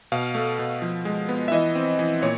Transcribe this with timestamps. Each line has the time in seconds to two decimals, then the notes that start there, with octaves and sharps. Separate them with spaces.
0.12 B2 F5
0.35 A3
0.59 B2
0.82 F3
1.05 G#3
1.29 B3
1.48 E5
1.52 E3 D#5
1.75 C4
1.99 E3
2.22 A#2 C#5